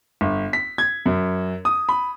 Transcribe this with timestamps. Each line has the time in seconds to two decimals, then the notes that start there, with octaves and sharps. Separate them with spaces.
0.21 G1
0.53 B6
0.78 G#6
1.06 F#2
1.65 D#6
1.89 B5